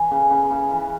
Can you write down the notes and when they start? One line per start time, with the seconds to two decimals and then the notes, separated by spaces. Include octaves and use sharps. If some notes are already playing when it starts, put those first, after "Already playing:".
Already playing: E3 G#5
0.11 C#3
0.31 C#3
0.51 C#3
0.71 E3